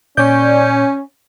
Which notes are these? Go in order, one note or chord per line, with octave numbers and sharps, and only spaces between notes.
A#2 C#4 D5 G6